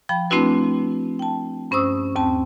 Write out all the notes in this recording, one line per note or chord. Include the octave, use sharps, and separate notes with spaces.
F3 G5 B5
A3 C4 D4 E4 F#4 B4
G5 A5
G2 C#4 C5 C#6 D#6 E6
D#2 C4 A5